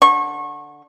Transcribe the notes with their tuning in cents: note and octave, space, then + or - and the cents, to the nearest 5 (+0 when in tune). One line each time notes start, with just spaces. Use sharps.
D3 +0 C#6 -30